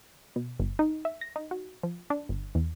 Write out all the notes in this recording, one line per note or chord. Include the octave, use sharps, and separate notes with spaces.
B2
G1
D#4
E5
A#6
D#4
F#4
F3
D4
G1
E2